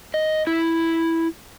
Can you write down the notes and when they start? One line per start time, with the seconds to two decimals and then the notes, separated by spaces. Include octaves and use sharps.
0.14 D#5
0.47 E4